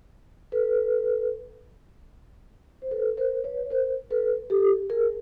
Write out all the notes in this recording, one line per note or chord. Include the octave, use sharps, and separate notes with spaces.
A4 B4
C5
A4 B4
A#4 C5
B4 C#5
A#4 C5
A4 B4
G4 A4
G#4 A#4